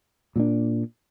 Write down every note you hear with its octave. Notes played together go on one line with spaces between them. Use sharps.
A#2 F3 A#3 D4